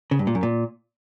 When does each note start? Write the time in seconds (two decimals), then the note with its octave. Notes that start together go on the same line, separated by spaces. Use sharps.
0.11 C#3
0.19 G2
0.27 A#2
0.35 F#2
0.43 A#2